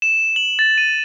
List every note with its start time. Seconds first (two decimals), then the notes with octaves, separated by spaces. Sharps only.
0.02 E7
0.36 F#7
0.59 A6
0.78 D#7